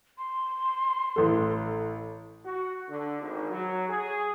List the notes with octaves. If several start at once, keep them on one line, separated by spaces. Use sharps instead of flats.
C6
A1 A4
F#4
D3
G#1
F#3
G#4